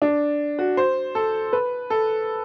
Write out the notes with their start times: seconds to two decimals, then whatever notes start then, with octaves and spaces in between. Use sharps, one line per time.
0.02 D4
0.59 F#4
0.77 C5
1.15 A4
1.53 B4
1.90 A4